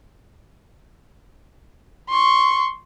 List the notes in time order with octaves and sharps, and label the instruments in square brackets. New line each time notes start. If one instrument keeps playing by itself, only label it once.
[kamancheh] C6 C#6